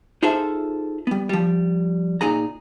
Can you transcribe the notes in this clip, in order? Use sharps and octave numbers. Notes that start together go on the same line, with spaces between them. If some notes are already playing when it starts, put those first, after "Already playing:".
D#4 F4 G#4 A4 C5 E5
G3 B3
F3 G3
A#2 D#4 G#4 A#5